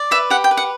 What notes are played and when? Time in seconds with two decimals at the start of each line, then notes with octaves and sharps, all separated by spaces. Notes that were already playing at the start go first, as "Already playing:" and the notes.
Already playing: D5
0.11 B4 E5
0.30 G4 F#5
0.44 G5
0.51 B4
0.57 F#5